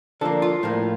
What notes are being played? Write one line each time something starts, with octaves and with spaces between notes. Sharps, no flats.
D3 F3 A#3 A4
F4
A2 F3 A#3